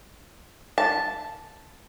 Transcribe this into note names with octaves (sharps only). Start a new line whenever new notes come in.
A5